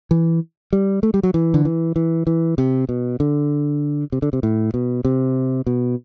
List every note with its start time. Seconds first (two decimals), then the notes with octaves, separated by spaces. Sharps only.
0.11 E3
0.73 G3
1.03 A3
1.14 G3
1.23 F#3
1.34 E3
1.54 D3
1.65 E3
1.96 E3
2.27 E3
2.58 C3
2.89 B2
3.20 D3
4.12 C3
4.22 D3
4.33 C3
4.43 A2
4.74 B2
5.05 C3
5.67 B2